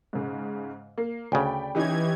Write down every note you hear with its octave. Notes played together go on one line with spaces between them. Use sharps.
G#2 C#3
A#3
D2 C#3 D5 G5 B5
E3 C#4 D#4 G4 G#6